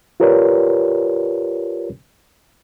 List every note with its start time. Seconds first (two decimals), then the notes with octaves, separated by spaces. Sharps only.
0.20 F4 G4 A#4 B4 C#5 D5